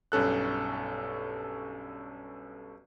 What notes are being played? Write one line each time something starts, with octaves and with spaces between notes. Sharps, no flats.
B1 G2 C#4 A4 F#6